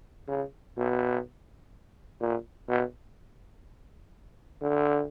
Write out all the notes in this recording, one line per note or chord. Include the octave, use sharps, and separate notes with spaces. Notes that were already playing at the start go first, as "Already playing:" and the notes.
C#3
B2
A#2
B2
D3